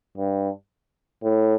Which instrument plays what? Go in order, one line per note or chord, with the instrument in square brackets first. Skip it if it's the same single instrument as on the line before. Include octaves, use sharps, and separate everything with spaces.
[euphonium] G2
A2